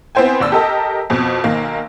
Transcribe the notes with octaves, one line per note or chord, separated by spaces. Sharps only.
B3 C4 E4 C5 G5 G#5
F1 D#2 D5 E6
G4 A4 A#4 D#5 A5 A#5
F2 B2
B1 D#3 A#3